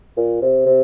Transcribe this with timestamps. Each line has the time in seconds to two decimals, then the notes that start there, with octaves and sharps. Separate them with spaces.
0.17 A#2
0.41 C3
0.66 C3